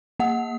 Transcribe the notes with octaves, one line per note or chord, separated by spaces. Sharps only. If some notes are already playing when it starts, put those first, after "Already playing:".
A#3 F#5